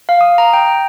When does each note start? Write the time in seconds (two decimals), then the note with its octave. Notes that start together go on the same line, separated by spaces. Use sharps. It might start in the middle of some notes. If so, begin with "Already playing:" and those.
0.09 F5
0.21 D#6
0.38 A#5
0.53 G5